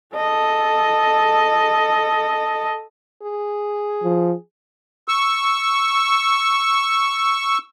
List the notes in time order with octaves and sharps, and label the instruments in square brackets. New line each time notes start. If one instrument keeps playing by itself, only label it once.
[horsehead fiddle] A4 D#5
[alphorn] G#4
[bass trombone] F3
[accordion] C#6 E6